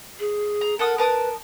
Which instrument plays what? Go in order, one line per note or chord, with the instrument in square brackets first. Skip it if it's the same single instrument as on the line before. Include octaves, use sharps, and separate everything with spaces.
[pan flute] G#4
[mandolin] A#5
[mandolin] A4 F#5 D#6 [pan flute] A#4
[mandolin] A#4 A5 D#6 [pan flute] B4